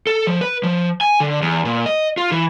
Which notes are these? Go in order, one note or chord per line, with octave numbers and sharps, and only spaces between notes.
A4
F3
B4
F3
G#5
D3
E2
A#2
D#5
F4
E3